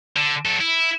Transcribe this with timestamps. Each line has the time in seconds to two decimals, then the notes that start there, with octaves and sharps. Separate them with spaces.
0.16 D3
0.45 F#3 A4
0.60 E4